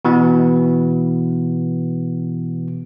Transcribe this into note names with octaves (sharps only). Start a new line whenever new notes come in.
B2 E3 B3